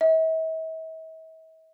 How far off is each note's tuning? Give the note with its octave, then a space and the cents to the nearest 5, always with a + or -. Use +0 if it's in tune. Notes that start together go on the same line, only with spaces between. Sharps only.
E5 -45